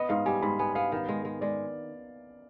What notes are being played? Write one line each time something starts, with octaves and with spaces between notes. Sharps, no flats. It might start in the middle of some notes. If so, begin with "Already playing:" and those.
Already playing: B3 D#5
G#2 F5
G3 G#5
G#2 B5
B3 G#5
B3 F5
D#3 F5
G#3
G#3
G#3 D5